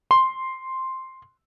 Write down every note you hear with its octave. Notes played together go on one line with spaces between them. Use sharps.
C6